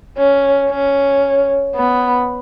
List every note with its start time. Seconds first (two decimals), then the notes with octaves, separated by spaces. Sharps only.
0.17 C#4
0.70 C#4
1.75 B3